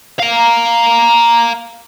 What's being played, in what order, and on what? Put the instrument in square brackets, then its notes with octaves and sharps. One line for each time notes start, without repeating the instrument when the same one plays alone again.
[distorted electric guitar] F5 A#5